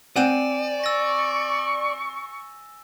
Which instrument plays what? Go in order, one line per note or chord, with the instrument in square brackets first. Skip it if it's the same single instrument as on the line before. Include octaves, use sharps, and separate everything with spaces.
[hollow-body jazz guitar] C4 F#5 [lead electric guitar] D5 [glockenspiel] G#5 D#7 E7
[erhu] C#6 [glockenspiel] E6 A6 A#6